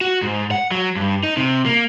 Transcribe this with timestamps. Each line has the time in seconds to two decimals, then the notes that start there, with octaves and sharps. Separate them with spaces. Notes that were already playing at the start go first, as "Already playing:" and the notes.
0.01 F#4
0.22 G#2
0.51 F#5
0.71 F#3
0.96 G2
1.23 D#4
1.37 C3
1.66 A#3